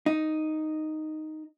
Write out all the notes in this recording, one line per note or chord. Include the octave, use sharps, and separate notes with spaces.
D#4